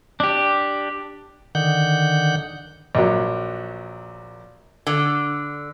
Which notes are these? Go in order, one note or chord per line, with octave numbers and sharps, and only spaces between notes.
D4 G4
D3 D#3 F#5 G6
A#1 F#3
D3